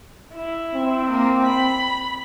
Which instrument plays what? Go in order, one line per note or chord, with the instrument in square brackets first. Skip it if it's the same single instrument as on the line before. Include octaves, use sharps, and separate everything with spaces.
[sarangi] E4
[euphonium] C4
[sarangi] A#3
B5